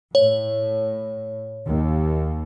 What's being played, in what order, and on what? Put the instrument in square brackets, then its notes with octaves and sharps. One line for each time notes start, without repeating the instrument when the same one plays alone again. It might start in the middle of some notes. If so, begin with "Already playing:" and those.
[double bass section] A2 [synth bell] C#5
[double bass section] D#2